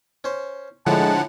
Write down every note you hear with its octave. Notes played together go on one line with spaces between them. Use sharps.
C#4 C5
A2 D3 F3 G#3 F#5 A5